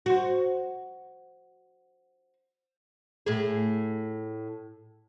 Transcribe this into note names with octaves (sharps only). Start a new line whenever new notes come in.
F#4 C5
A2 G#4